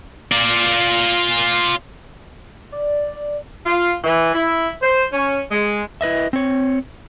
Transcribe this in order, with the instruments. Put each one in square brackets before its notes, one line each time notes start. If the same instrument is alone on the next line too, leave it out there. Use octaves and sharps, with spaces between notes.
[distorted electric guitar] F4 D5
[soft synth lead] D5
[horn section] F4
E3
E4
C5
C#4
G#3
[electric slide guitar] E4 B4 D#5 E5
C4 C#5